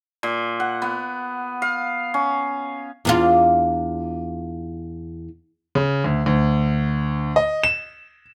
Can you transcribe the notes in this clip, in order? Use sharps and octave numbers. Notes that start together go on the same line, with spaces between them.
A#2
F#5
B3
F5
C#4
E2 D4 F4
C#3
D2
D2
D#5
E7